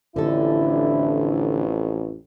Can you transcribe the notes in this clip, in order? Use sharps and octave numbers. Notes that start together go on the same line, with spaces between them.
A1 F2 D3 D4 E4 A4